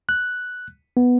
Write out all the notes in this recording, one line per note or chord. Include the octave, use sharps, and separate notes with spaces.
F#6
B3